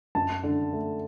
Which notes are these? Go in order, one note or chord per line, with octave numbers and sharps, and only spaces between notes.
F#2 A5
D3
A3